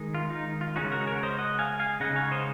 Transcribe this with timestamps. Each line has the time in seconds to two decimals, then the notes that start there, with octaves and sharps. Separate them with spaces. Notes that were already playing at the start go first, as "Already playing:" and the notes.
Already playing: D#3 G#3 D#4
0.15 F4
0.30 D#4
0.61 F4
0.76 C#3 G#3 C#4 D#4 F#4
0.92 F#4 A#4
1.07 A#4 C#5
1.23 C5 D#5
1.38 D#5 F#5
1.59 F5 G#5
1.80 F5 G#5
2.00 C#3 G#3 D#4 D#5 F#5
2.16 C#5 F5
2.31 C5 D#5